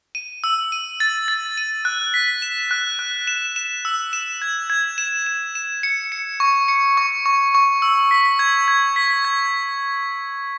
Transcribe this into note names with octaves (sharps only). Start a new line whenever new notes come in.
D#7
E6
D#7
A6
A6
D#7
F#6
B6
E7
F#6
F#6
E7
E7
E6
E7
G#6
G#6
E7
E7
E7
C#7
C#7
C#6
C#7
C#6
C#6
C#6
E6
B6
G#6
G#6
B6
G#6